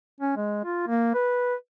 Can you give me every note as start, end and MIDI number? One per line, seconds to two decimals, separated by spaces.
0.21 0.34 61
0.36 0.60 56
0.64 0.83 65
0.87 1.11 58
1.15 1.55 71